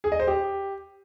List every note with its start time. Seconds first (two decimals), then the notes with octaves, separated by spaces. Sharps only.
0.04 G#4
0.12 D#5
0.20 C5
0.27 G4